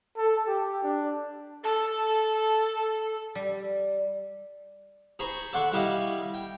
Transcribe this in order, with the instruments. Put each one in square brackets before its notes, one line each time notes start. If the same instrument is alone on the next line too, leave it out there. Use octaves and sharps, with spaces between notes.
[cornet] A4
G4
D4
[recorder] A4
[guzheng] G3
[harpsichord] G#4 C5 A#5 B5 C#6
A4 D5 F#5 C6 C#6
G3 E4 G4 D#5 F5
G5